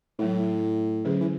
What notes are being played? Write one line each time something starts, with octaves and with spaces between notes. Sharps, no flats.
A2 F#3 A3 E4
D3 F#3 C#4 G#4 B4
E3